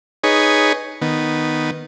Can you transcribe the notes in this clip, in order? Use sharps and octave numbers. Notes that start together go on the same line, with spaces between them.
D#4 G#4 B4 C#5
D#3 B3